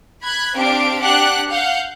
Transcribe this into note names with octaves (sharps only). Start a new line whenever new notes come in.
B5 F#6 G#6
C4 D4 G4 F5 D7
D4 G4 F#5 F#6
F5 F#5 G6